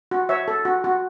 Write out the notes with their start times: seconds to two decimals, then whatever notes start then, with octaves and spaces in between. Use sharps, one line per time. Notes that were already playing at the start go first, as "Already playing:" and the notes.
0.11 F#4
0.29 C#5 E5
0.48 A4
0.65 F#4
0.84 F#4